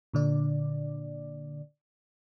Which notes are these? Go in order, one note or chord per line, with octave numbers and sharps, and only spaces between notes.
A#2 D3 D5